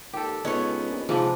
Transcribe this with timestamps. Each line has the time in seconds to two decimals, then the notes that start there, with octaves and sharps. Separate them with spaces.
0.13 D#2 G4 A4
0.45 C#2 B3 C#4 D#4 C#5
0.90 A#1
1.09 G#2 C3 F3 D4 B4